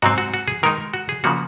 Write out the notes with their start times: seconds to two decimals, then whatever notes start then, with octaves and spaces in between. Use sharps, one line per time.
0.02 G#2 F#3 C4 F#4
0.18 F#4
0.34 F#4
0.48 G#4
0.63 D#3 G#3 D#4 A#4
0.94 F#4
1.09 G#4
1.24 C#3 F3 A#3 F#4